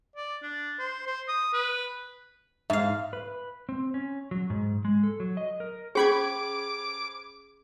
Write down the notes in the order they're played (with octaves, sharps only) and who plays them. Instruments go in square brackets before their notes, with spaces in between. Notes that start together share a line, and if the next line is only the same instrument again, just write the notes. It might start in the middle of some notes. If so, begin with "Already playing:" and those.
[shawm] D5
D4
C5
C5
D#6
B4
[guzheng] G#2 F5 [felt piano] E5
[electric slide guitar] B4
C4
C#4
F#3
G#2
G#3
A4
F#3
D#5
A#4
[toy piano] C#4 G#4 [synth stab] C5 B5 G#6 [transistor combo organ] D6